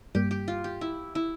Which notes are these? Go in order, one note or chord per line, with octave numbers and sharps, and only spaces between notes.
G2 G3 A#3 G4
G4
F4
G4
E4
E4